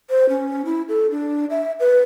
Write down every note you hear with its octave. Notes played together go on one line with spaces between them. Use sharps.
C5
C#4
E4
A4
D4
E5
B4